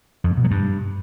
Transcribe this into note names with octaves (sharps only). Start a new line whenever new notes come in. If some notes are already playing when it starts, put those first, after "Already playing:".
F2
G#2
B2
F#3
G2